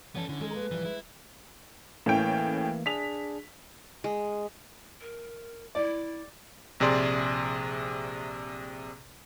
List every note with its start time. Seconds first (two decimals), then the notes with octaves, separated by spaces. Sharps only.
0.15 E3 B3 C#4 A4 C#5 A5
0.29 D3 E4 C#5
0.40 D#3 G#3 D#4 A4
0.54 A3 A#3 B4
0.71 A#2 E3 F3 G3
0.85 G#3 E4
2.06 A2 E3 A3 A#3 C#4 G5
2.86 D4 G#4 B6 F7
4.04 G#3
5.01 A#4
5.75 E4 D5
6.80 A#1 C3 G#4 D5 C6